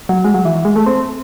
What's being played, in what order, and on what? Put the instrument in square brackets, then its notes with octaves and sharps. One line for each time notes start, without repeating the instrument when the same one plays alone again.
[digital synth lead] F#3
G#3
F#3
E3
E3
G#3
A3
C4